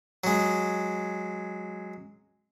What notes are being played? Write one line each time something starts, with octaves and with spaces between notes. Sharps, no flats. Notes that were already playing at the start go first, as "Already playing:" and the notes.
F#3 G#3